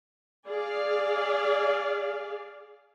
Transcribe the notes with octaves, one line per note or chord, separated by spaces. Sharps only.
G#4 D5 F5